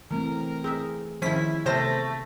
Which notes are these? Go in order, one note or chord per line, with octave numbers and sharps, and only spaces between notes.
E3 A3 C4 A#4
C4 D#4 G#4 E5
D#3 F3 C#4 E4 B6
C3 A3 B3 A#4 C5 A#6